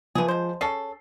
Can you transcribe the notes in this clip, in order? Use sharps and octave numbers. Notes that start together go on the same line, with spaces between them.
E3 F3 G#4
G#3 C5
C#4 G#4 A4 C7